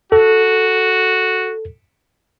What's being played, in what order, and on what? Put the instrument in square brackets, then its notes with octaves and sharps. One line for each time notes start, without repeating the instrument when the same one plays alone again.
[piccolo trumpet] F#4 [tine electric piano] A4